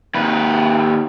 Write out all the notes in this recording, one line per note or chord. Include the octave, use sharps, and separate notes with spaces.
D#2 B4